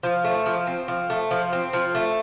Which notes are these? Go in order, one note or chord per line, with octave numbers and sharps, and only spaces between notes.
F3
A3
F3
C4
F3
A3
F3
C4
F3
A3